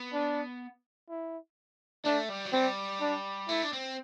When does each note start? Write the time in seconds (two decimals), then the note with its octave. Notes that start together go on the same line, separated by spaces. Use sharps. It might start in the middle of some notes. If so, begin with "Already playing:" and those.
Already playing: B3
0.13 D4
1.09 E4
2.05 A3 D4
2.29 G3
2.45 F#3
2.53 G3 C4
3.01 D4
3.48 A3 E4
3.62 D4
3.73 C4